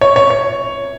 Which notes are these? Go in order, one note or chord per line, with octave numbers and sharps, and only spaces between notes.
C#5
C#5
C#5